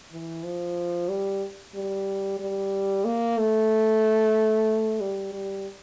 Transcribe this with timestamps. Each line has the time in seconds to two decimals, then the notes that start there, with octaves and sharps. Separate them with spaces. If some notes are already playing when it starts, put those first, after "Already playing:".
0.12 E3
0.44 F3
1.09 G3
1.75 G3
2.40 G3
3.05 A#3
3.38 A3
5.00 G3
5.33 G3